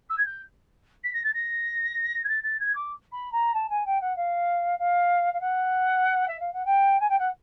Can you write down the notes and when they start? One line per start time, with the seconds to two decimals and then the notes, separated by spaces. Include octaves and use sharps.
0.09 E6
0.17 G#6
0.25 G6
1.03 B6
1.13 A#6
1.24 A6
1.33 A#6
2.24 G#6
2.28 A6
2.43 A6
2.59 G#6
2.75 D6
3.11 B5
3.32 A#5
3.53 A5
3.69 G#5
3.85 G5
4.00 F#5
4.16 F5
4.78 F5
5.33 F5
5.40 F#5
6.27 E5
6.39 F5
6.53 F#5
6.65 G5
6.99 G#5
7.08 G5
7.18 F#5